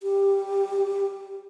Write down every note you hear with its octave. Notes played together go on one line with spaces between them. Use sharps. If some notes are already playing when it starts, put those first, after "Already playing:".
G4